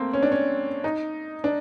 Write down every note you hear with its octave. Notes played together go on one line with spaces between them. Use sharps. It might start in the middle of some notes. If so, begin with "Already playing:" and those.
Already playing: A3 A#3 C4
C#4
D4
C#4
D#4
D4